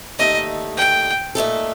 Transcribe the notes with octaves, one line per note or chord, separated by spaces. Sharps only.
D#2 D3 A3 D#4 A4 D#5
G5
A#2 A3 D#4 A4